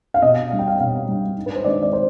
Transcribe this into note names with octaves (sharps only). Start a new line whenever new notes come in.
F5
B2 D#5
G3 D4 F5
G5
F5
B2 F5
G3 D4
G#2
B4
C5
D#3 G#3 D4 D5
D5
C5